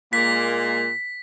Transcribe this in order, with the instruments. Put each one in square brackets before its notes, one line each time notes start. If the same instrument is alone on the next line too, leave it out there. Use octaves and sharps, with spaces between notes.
[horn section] A#2 G#3 A#3 [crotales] B6